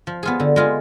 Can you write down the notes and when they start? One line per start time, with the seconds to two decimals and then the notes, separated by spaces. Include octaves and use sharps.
0.07 F3
0.23 B3 F4 G#4
0.40 D3
0.56 G#3 B3 F4 G#4